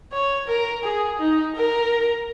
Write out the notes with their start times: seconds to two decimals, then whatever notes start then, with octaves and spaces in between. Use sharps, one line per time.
0.12 C#5
0.47 A#4
0.84 G#4
1.19 D#4
1.56 A#4